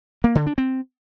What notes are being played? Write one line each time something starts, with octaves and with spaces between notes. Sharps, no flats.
A#3
D3
D4
C4